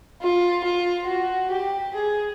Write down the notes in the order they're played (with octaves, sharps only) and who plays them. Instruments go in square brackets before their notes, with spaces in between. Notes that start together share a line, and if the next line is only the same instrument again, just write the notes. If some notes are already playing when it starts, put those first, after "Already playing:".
[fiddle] F4
F4
F#4
G4
G#4